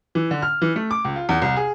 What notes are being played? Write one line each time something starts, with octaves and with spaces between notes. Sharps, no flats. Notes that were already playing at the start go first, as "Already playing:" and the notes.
E3
D3
F6
E3
A3
D6
C#2
F4
E2
C2
G#4